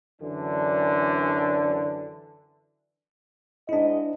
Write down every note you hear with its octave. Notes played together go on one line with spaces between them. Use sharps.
F#2 D3 E3 D4
G#2 D4 E4 D#5